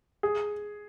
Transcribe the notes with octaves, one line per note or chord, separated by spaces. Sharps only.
G#4